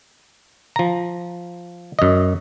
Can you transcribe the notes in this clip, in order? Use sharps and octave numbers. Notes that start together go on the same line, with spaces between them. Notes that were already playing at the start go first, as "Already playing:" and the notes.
F3 A#5
F#2 D#5